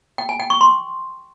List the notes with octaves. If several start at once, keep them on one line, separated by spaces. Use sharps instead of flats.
G5
G#5
G5
C#6
C6